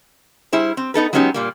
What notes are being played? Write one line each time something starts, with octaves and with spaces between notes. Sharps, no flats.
G3 E4 G#4 C5
C4
B3 D#4 A4 B4
F#3 G#3 B3 C#4 D#4 G4
A#2 G3 A#3